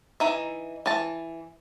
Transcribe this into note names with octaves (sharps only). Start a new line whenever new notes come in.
E3 D#4 E5
E3 A5